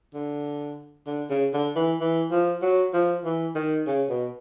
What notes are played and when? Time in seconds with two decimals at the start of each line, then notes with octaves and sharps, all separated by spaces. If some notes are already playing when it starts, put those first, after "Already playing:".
0.14 D3
1.06 D3
1.29 C#3
1.54 D3
1.76 E3
2.00 E3
2.31 F3
2.62 F#3
2.93 F3
3.25 E3
3.55 D#3
3.87 C#3
4.09 B2